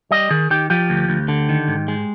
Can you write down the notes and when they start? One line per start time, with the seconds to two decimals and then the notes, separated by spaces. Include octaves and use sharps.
0.11 G3 D#5
0.31 D#3 G#4
0.50 D#3 G4
0.70 F3 G4
0.90 D2
1.09 D2
1.28 D3
1.49 D#3
1.68 G#2
1.88 G#3